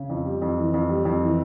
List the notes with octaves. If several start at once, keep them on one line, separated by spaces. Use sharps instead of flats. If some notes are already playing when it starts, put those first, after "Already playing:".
Already playing: C#3
F2
G3
F2
E3
F2
G3
F2
E3